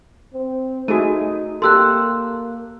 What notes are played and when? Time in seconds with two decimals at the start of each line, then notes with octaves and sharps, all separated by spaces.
0.34 C4
0.88 A3 D#4 F#4 G#4 D#7
1.62 A#3 G4 A4 C6 E6 F#6